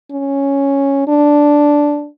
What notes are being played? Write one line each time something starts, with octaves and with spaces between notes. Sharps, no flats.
C#4
D4